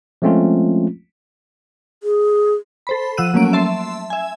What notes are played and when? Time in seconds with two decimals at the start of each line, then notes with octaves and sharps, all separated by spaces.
0.22 F3 G#3 A3 C4 C#4 F4
2.03 G#4
2.87 A4 C5 B5
3.17 F3 F#5 E6 F#6 D#7
3.34 F#3 A3 A#3 C#4 D7
3.53 E5 A5 C6
4.10 E5 G#5